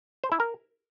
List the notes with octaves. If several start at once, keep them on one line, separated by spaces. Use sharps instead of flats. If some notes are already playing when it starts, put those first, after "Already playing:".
C5
E4
A#4